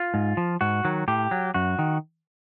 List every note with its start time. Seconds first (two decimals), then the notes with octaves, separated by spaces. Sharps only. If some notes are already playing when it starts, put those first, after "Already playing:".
Already playing: F4
0.14 G#2
0.37 F3
0.61 G#2 F#4
0.85 D#3 F#3
1.08 A2 G4
1.31 F#3
1.54 F#2 F#4
1.79 D#3